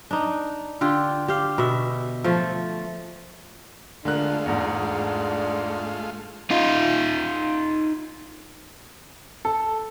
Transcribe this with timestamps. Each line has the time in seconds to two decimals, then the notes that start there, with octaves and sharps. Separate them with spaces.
0.11 D4 D#4
0.81 D3 F4 G4
1.28 G4 F5
1.58 B2 E5
2.24 F3 A3
4.05 D3 G#3 A3 D4 F4 A#4 F#6
4.46 E2 G#2
6.51 D#4 F4
9.45 A4